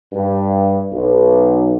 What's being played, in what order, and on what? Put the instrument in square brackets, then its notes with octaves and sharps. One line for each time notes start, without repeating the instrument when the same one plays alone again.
[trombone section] G2
B1